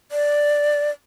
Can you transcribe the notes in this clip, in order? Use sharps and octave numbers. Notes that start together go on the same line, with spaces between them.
D5